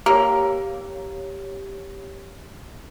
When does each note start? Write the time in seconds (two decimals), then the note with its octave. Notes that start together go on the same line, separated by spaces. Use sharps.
0.06 A#3 G4 C#5